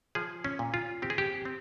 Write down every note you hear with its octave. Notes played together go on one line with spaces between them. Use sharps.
F3 G#4
C#4
A#2
F4
C4 G4
G#4
G4
C4